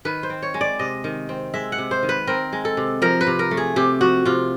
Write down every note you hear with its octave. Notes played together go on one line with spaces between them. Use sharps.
D#3 B4
C5
C4
C#5
G#3
D5
C3 D#5
D#3
C4
G#3 E5
F#5
C3
C5
D#3
B4
C4 A#4
G#3
A4
C3
F3 A#4
B4
C3
A#4
A3
G#4
C3 G4
F3 F#4
C3 F4